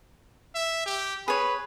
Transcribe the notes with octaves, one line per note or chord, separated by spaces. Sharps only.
E5
G4
G#4 B4 C#5 B5